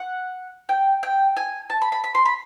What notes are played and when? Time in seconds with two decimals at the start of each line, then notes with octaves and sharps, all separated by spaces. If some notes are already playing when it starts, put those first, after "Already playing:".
Already playing: F#5
0.69 G5
1.03 G5
1.37 G#5
1.70 A5
1.82 B5
1.92 B5
2.04 B5
2.15 C6
2.25 B5